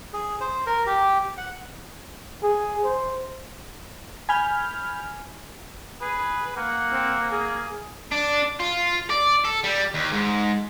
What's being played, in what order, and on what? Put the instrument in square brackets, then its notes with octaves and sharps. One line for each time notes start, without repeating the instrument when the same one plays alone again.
[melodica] G#4
C5
A#4
G4
F#5
[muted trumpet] G#4
C5
[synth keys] G#5 B5 F6 G6
[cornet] G#4 [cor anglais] B4
[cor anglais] A#3 [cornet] F#5
[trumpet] C4
G#4
[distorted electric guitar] D4
F4
D5
A4
G3
D#2
G#2